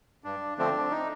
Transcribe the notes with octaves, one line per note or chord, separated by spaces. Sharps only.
G2 D4
D3 F3 A3 C4 D4
D#4